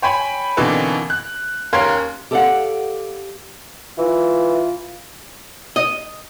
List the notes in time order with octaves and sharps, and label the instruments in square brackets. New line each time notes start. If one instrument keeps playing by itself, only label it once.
[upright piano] C#5 G5 G#5 B5
B2 D3 E3 A#3 C4 D#4
F#6
D#2 C#4 A#4 F5 C6 G#6
[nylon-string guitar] G4 A4 D5 D#5 F5 F#5
[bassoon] E3 [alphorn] F4
[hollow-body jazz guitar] D#5